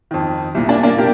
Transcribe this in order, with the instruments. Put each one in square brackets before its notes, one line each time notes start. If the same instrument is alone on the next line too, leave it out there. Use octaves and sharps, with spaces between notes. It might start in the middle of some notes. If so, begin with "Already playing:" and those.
[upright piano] F2 D#3
C2 A#2
A#3 D4
A#3 D4
A#2 G4 A#4